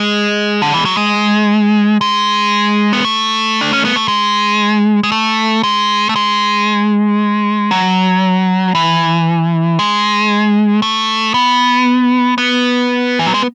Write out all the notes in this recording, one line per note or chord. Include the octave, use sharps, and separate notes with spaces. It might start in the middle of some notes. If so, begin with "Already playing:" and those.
Already playing: G#3
D3
E3
F#3
G#3
G#3
B3
A3
D4
C#4
B3
A3
G#3
G#3
A3
G#3
A3
G#3
F#3
E3
G#3
A3
B3
B3
E3
F#3
G#3